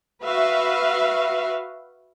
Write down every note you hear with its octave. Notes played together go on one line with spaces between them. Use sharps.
F#4 B4 E5 F5